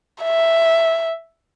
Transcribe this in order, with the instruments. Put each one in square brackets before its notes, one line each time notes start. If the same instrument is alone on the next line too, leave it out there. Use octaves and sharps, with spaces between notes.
[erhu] E5